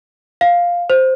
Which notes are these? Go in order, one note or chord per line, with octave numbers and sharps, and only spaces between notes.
F5
C5